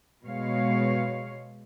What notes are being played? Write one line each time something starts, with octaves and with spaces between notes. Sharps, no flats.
B2 G#3 C#5 F5